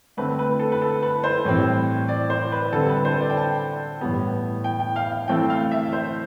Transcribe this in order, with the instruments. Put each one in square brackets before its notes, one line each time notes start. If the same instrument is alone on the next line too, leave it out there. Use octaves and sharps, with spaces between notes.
[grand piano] D3 A3 C4 B4
B4
A4
B4
A4
B4
C5
A2 E3 G3 C4
D5
C5
B4
D3 G3 C4 A4
B4
C5
D5
G5
A5
A2 E3 G3 B3
G5
G5
F5
F5
E3 A3 C4 G5
F5
E5
C5